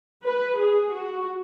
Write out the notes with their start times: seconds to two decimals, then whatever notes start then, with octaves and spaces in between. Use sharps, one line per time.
0.24 B4
0.59 G#4
0.93 F#4